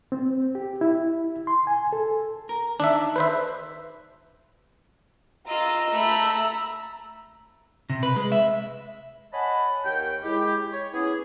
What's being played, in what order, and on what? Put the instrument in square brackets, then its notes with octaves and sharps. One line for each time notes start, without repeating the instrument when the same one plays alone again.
[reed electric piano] C4
G4
E4
C6
G#5
A4
[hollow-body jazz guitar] A#4
[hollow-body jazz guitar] D#3 [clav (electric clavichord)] D4 E5
[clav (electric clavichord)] B4 C5 E5
[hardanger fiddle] F4 D#5 [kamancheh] A#5 E6
[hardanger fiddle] A3 B5
[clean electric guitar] C3
B4
G#3
E5
[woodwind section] C#5 D#5 F#5 G#5 A5 B5
D#2 A#4 C#5 G5
G#3 E4 G4
C#5
B3 C#4 E4 G#4